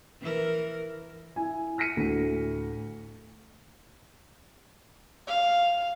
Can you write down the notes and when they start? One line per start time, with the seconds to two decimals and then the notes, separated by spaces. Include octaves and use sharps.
0.22 E3 A#4
1.36 E4 G#5
1.78 F6 A#6 B6 C#7 D#7
1.97 D2 A2
5.28 F5